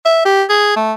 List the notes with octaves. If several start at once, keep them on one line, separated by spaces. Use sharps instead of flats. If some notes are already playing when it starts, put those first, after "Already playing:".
E5
G4
G#4
A3